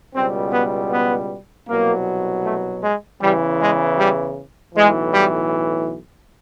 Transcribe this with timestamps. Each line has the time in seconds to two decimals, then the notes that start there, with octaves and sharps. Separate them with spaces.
0.15 C#2 B2 G3 C4
0.52 B3
0.91 B3
1.68 C2 B2 F#3 A#3
2.44 A3
2.83 G#3
3.21 E2 C#3 E3 G3
3.59 G#3
3.97 G3
4.75 B1 A2 E3 G#3
5.14 G3